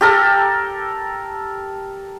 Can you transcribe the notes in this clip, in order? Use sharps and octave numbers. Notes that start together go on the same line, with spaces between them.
G4 A4 A#4